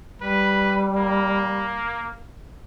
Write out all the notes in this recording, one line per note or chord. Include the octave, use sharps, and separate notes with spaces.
G3 B4
A#3